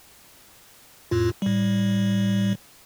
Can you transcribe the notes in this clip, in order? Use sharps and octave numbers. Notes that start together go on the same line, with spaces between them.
F2 A2 F4
A2 G3